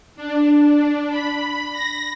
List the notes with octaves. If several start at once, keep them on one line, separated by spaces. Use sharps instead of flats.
D4
B5
A#6